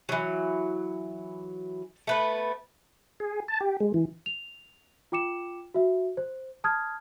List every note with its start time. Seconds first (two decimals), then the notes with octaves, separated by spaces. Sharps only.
0.09 E3 F#3
2.07 A3 B3 B4
3.20 G#4
3.48 A5
3.60 G4
3.80 G#3
3.94 E3
4.26 F7
5.12 F4 G5 D6 C#7 E7
5.74 F#4 E5
6.17 C5
6.64 A5 D#6 F6 G#6